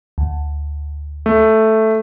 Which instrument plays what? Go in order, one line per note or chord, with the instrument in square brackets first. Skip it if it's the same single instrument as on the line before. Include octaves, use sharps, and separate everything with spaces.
[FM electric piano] D2
[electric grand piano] A3